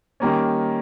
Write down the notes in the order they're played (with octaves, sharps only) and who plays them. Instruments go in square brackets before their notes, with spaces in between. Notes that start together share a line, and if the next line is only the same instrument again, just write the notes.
[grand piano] D#3 G3 A#3 C#4